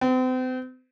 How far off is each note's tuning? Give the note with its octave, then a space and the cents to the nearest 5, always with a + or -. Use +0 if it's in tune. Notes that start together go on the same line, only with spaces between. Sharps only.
C4 -40